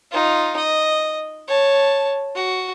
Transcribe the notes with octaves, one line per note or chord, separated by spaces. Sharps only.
D#4 F4
D#5
C#5 A5
F#4